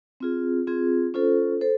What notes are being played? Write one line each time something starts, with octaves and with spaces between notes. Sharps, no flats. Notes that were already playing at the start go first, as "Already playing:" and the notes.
C4 F4 G#4
C4 F4 G#4
C#4 F4 A4 C5
A4 C5